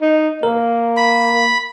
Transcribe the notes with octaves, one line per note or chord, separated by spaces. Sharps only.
D#4
A#3 A#4
B5